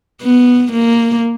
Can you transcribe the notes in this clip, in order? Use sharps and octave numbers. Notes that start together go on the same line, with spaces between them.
B3
A#3